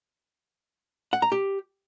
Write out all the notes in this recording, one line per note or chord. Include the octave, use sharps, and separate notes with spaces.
F#5
A#5
G4